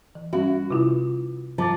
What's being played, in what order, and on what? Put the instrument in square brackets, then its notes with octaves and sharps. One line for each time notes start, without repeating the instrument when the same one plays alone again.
[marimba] E3
[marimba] G3 C#4 E5 [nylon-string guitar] F#4
[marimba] C3 E4 F4
[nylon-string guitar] F3 [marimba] A#5 D6 A6